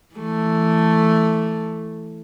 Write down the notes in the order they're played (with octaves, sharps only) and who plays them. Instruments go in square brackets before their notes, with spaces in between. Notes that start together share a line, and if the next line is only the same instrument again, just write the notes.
[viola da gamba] E3 A3